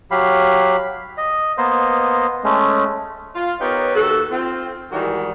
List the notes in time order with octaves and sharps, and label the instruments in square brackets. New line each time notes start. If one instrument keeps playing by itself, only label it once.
[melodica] F#3 G4 F5 B5
D#5
A#3 B3 C5 D#5
G#3 A3 C#4
[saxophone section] F4
B3 D#4 G4 A#4 B4 C#5
D#2 F#4 A4
C4 F4
G#2 D#3 E3 G3 F#4 A#4